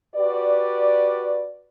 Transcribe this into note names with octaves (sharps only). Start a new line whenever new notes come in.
F#4 G4 B4 D5